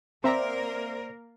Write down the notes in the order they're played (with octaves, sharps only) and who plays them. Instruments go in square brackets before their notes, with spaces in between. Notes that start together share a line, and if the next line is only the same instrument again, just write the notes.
[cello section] A#3 A#4 [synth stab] C4 E5 A#5 [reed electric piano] C5 D5